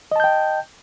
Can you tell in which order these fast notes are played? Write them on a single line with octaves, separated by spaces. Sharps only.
D#5 A5 G6 G5